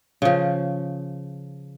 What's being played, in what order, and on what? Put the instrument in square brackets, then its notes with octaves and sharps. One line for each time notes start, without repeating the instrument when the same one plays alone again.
[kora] C#3 F3